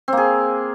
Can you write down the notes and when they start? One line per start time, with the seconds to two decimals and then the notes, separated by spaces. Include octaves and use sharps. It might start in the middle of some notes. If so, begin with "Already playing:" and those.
0.08 C4
0.13 A#3
0.17 G#4